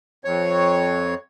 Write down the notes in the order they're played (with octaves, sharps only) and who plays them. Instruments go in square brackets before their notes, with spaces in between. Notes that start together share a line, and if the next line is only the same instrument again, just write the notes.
[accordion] F2 C#5